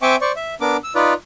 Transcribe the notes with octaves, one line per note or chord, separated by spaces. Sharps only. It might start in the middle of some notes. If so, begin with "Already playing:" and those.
C4 E5 G5 G#5 C#6 D6
C5 D5 C#6
E5
B3 D4 A#4 D6
E6
D#4 F4 B4 D5